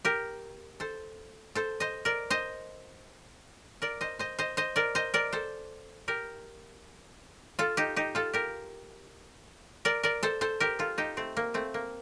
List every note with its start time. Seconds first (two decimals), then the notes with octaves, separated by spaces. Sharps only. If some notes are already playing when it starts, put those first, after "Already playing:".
0.05 G4 A#4
0.80 A4 C5
1.55 A4 C5
1.80 C5 D#5
2.05 A#4 D5
2.30 C5 D#5
3.82 A#4 D5
4.01 C5 D#5
4.19 C5 D#5
4.39 C5 D#5
4.57 C5 D#5
4.76 A#4 D5
4.95 C5 D#5
5.14 A#4 D5
5.33 A4 C5
6.08 G4 A#4
7.59 F4 A4
7.77 D#4 G4
7.96 D#4 G4
8.15 F4 A4
8.33 G4 A#4
9.85 A#4 D5
10.03 A#4 D5
10.23 A4 C5
10.41 A4 C5
10.60 G4 A#4
10.79 F4 A4
10.98 D#4 G4
11.17 A3 C4
11.37 A#3
11.54 A3 C4
11.74 A#3